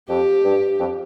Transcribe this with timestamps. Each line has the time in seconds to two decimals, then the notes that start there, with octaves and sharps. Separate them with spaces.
0.09 F2 G4
0.44 G2
0.79 F2